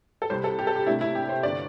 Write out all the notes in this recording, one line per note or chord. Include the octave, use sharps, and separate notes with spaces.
A4
C2 C3 G3 C5
A4
G4
A4
G4
C2 C3 A3 D4 E4
E4
G4
C5
G1 D3 D5